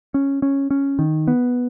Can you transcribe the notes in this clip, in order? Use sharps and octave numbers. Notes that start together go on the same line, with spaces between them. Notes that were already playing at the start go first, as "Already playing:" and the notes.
C#4
C#4
C#4
D#3
B3